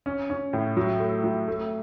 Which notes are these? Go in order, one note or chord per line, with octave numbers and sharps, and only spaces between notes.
C#4
C#4
A2
F#3
A3
F#3
A3